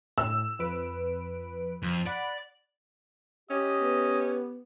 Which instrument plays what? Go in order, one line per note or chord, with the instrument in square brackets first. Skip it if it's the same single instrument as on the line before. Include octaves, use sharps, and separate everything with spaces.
[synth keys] A2 [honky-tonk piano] E6
[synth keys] F2 B4 D7
[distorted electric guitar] F2
[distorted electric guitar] D5 [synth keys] F#5 B5 D7
[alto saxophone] C#4 [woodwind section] G4 [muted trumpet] D#5
[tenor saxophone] B3